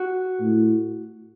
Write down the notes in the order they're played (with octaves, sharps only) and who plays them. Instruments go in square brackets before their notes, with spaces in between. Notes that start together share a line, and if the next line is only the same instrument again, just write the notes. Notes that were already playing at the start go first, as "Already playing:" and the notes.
Already playing: [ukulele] F#4
[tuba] A2